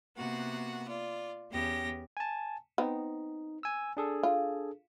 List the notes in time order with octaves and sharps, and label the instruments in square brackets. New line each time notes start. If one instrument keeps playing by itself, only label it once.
[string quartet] C3 A#3 B3 F#4 F#5
F4 D5
E2 B3 C#4 G4 A#6
[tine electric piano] G#5 A5
[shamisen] B3 C4 [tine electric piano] D#4
[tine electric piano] G#5 E6
D4 G#4 A4
[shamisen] F4